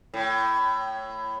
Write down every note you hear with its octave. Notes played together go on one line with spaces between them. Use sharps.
A2